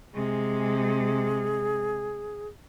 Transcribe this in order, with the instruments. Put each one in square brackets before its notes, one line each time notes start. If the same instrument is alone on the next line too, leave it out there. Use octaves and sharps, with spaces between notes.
[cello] C3 G#3 [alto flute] G#4